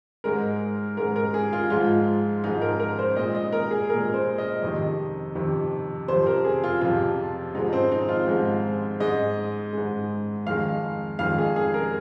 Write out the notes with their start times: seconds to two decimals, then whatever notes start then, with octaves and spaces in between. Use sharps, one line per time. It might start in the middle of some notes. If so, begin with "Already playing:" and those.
0.24 G#2 G#3 A#4
0.97 G#2 G#3 A#4
1.16 A#4
1.34 G#4
1.53 F4
1.70 G#2 F3 G#3 F4
2.44 G#2 F3 G#3 D#4
2.62 A#4
2.80 A#4
2.99 C5
3.17 A#2 G#3 D#5
3.35 D#5
3.52 A#4
3.71 G#4
3.90 A#2 G#3 A#4
4.14 C5
4.38 D#5
4.62 F2 C3 D#3 D#5
5.35 F2 C3 D#3
6.08 F2 C3 F3 C5
6.27 A#4
6.44 G#4
6.64 F4
6.81 F2 C3 F3 F4
7.55 G#2 F3 G#3 D#4
7.73 C4
7.91 D#4
8.09 F4
8.27 G#2 F3 G#3
9.00 G#2 G#3 D#5
9.73 G#2 G#3
10.46 F2 D#3 G#3 F5
11.19 F2 D#3 G#3 F5
11.38 G#4
11.56 G#4
11.74 A#4